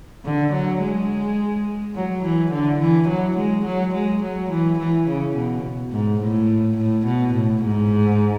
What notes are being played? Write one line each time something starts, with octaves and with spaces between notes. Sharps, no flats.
D3
F#3
G#3
F#3
E3
D3
E3
F#3
G#3
F#3
G#3
F#3
E3
E3
C#3
B2
G#2
A2
A2
B2
A2
G#2